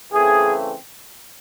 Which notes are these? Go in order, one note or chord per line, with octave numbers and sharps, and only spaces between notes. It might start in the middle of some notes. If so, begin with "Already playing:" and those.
C#3 E3 A3 C4 G#4